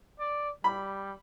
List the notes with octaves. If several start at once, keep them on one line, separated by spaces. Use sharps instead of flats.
D5
G3 B5